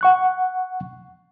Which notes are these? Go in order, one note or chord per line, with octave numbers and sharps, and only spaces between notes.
F#5 C#6 F#6